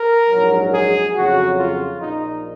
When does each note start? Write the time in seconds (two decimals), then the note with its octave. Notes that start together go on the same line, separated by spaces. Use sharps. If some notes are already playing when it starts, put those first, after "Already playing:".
Already playing: A#4
0.28 A#1 G#2 F#3
0.71 G#4
1.14 F2 C#3 F#3 F#4
1.57 F4
2.00 A#1 A#2 F3 D#4